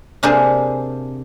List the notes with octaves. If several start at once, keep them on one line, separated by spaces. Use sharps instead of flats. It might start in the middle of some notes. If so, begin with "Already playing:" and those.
C3 A#3 D4 G#4 C5 G#5